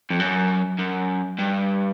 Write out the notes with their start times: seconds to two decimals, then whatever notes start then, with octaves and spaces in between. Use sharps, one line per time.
0.10 F2
0.20 F#2
0.79 F#2
1.39 G2